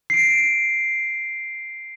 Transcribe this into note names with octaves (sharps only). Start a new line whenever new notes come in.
C7 D7